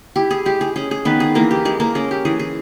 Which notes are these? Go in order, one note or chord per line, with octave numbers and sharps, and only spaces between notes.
E4 G4
G#4
G#3 G4
G#4
C#4 G#4
G#4
D#3 B3 B4
G#4
E3 A#3 A#4
G4
G#3 G#4
A#3 A#4
C#4 G#4
G4
E3 G#4
G#4